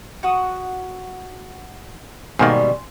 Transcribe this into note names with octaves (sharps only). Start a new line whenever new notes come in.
F#4 F#5 D#6
G#2 B2 D#3 G3 A#3 G#5 C6